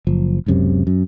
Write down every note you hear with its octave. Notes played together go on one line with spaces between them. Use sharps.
F#1 F3
F#1 C#2 F#2 C3
F#2